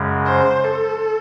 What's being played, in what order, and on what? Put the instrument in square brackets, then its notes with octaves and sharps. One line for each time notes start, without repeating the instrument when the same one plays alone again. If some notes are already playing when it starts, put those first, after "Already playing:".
Already playing: [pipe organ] F#2 C#3 G#3
[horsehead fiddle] C5
A4